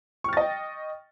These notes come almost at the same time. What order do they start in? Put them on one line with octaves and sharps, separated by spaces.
C#6 F6 A6 D#5 G5